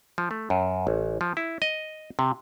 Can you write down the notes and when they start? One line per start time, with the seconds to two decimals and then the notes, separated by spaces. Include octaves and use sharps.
0.18 F3
0.31 A3
0.50 F#2
0.87 A1
1.21 F3
1.37 E4
1.62 D#5
2.19 C3